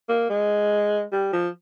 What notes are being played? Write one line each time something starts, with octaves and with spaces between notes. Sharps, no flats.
A#3
G#3
G3
F3